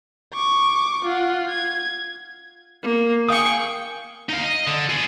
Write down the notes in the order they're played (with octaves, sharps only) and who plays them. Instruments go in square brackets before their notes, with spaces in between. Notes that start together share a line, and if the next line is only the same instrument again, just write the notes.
[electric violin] C#6 D6
F4 F#5
G#6
[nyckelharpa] A#3
[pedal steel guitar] G#4 F5 D#6 [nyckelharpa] G5 C#6
[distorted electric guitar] D#4 F5
D#5
D3
B3 G#4